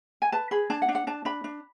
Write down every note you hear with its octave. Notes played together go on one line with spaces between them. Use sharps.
G#5
B4 A5
G#4 B5
D4 A5
F#5
D4
F#5
D4 A5
D4 B5
D4